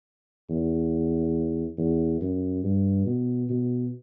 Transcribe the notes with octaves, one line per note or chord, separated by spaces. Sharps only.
E2
E2
F#2
G2
B2
B2